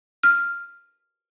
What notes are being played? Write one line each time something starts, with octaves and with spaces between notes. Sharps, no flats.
F6